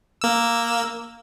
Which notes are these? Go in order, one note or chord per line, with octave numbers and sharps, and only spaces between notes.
A#3 E6